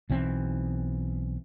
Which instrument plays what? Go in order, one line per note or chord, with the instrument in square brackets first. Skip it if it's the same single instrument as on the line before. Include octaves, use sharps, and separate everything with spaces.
[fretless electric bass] B1 E3 C4